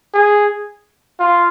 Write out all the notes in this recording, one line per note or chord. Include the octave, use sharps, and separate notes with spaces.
G#4
F4